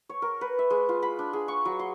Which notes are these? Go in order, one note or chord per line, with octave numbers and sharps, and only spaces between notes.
C#5
A#4
B4
E5
G#3
F4
B5
D4
G#4
C#6
F#3
C6